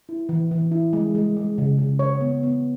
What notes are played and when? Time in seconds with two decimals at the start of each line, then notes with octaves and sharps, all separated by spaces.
0.09 E4
0.29 E3
0.51 E3
0.72 E4
0.93 G#3
1.15 G#3
1.37 G#3
1.58 C#3
1.78 C#3
1.99 C#5
2.21 B3
2.43 B3